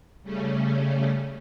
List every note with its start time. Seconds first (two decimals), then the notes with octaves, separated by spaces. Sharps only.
0.23 C#3 G3 A3 C#4